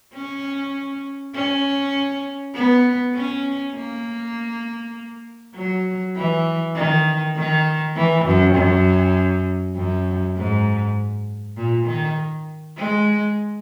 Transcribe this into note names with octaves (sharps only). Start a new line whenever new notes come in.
C#4
C#4
B3
C#4
A#3
F#3
E3
D#3
D#3
E3
F#2
F#2
F#2
G#2
A#2
D#3
G#3